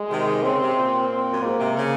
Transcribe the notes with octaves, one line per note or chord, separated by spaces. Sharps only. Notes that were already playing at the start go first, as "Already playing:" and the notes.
Already playing: G#3
C3 D#3
C#3 C4
C3
A#2
C4
F#2
G#2 A#3
C3
C#3